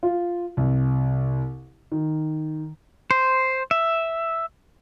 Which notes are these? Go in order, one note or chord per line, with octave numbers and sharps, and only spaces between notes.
F4
C2
D#3
C5
E5